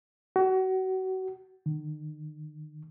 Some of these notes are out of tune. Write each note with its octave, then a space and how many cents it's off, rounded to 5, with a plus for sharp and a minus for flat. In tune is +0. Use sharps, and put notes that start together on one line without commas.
F#4 +30
D#3 -40